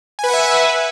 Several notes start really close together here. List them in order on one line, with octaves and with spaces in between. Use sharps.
G#5 B4 F#5 E5